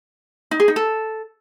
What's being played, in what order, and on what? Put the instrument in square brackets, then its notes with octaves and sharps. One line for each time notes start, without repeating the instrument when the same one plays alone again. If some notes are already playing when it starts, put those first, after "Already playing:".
[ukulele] D#4
G#4
D#4
A4